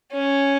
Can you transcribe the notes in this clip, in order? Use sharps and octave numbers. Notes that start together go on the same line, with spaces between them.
C#4